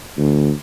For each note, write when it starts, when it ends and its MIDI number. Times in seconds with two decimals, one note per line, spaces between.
0.17 0.52 38